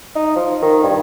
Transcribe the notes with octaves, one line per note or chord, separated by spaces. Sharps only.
D#4
F3
D#3
G2